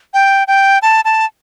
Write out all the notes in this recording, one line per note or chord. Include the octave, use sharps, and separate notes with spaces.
G5
G5
A5
A5